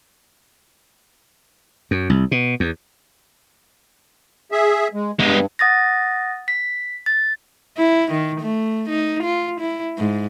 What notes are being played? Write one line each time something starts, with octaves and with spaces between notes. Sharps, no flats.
F#2
C2
B2
E2
G#4 E5
G#3
G2 G#3 B3
F#5 D#6 A6 A#6
B6
A6
E4
D#3
A3
D#4
F4
E4
G#2